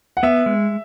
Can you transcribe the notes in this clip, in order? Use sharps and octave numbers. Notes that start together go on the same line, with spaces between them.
F#5
B3 E5
G#3